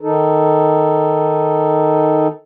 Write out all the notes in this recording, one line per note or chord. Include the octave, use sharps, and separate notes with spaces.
D#3 D#4 A4